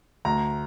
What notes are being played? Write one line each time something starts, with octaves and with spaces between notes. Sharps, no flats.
D2 A#5